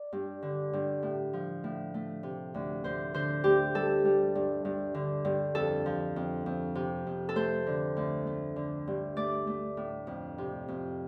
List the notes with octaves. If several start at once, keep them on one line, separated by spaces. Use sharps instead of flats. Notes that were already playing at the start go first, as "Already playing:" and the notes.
Already playing: D5
G2
D3
G2
A2
F3
A2
A3
C3
D2
D2 C5
D3 C5
D2 G4
G3 A4
G3
G2
G2
D3
G2
F2 A4
F3
F2
F2
C3
F2
A4
A3 C5
D3
D2
A3
D3
G2
A3 D5
A3
A2
F2
C3
F2